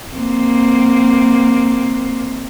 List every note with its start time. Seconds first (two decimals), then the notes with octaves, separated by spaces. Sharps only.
0.12 A#3 C4